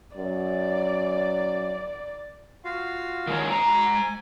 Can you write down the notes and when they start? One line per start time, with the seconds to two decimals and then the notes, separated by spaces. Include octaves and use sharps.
0.17 F#2 D5
2.65 F4 F#4 F5
3.27 D#3 G#3 C#5
3.50 G#3 A#5
3.67 F#4 B5
3.95 G#5